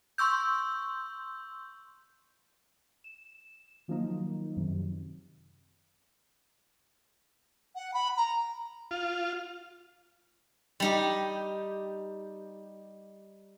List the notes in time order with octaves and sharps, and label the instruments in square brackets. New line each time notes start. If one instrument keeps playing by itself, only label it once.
[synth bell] C6 C#6 E6 G6
[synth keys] E7
D#3 F3 F#3 A#3 D#4
F#2 C3 D#3
[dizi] F#5
B5
A#5
[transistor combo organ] F4
[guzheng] G3 D#4 G4